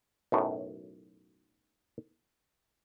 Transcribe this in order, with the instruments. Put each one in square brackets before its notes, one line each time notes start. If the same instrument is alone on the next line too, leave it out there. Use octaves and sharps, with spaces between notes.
[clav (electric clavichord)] B1 F#2 A2